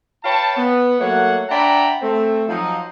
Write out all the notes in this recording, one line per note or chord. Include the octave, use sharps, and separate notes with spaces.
B4 C#5 F5 G5 A5
B3
F#3 A3 A#3 C#5 F#5
D4 E5 F#5 G5 A#5 B5
A3 C4
F3 F#3 D#4